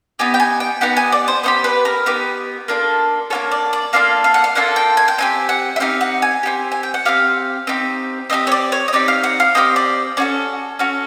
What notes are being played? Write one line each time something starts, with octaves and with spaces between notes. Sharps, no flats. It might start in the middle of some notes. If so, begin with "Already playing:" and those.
B3 D#4 G4 G#5
G5
G#5
G5
B3 D#4 G4 F#5
G#5
D5
C5
B3 D#4 G4 C5
B4
A#4
B3 D#4 G4
A#3 D4 F4 A4
A#3 D4 F4 A4 C#5
D5
D5
A#3 D4 F4 A4 F5
F5
F#5
F5
A#3 D4 F4 A4 F#5
G5
G#5
G5
C4 D#4 G4 G#5
F#5
E5
C4 D#4 G4 F5
F#5
G#5
C4 D#4 G4
G#5
G5
F#5
C4 D#4 G4 F5
C4 D#4 G4
C4 D#4 G4 D#5
C#5
D5
C#5
D#5
C4 D#4 G4 D5
F5
F#5
F5
C4 D#4 G4 D#5
D5
C#4 F#4 A4 D5
C#4 F#4 A4